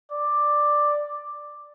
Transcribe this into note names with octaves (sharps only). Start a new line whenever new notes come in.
D5